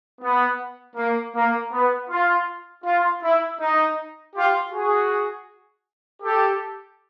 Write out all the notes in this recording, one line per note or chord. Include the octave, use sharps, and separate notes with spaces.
B3
A#3
A#3
B3
F4
F4
E4
D#4
F4 G4
F#4 G#4
G4 A4